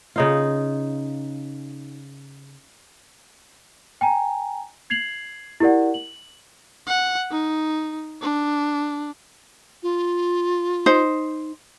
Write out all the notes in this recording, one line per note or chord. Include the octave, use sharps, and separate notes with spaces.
C#3 D#4 F4
G5 G#5 A#5
G#6 C7 F7 F#7
E4 G4 A#4 D5 F#5
F#7
F#5
D#4
D4
F4
D#4 C5